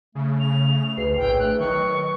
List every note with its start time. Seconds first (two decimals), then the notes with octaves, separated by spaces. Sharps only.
0.15 C#3 A3
0.40 F7
0.97 D2 G#4 B4 C7
1.17 A#1 A2 B4 G5
1.39 A3 F#6
1.60 D#3 F#3 C#6